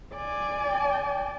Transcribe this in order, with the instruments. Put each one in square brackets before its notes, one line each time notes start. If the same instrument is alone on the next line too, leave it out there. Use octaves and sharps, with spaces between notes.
[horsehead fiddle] D5 G#5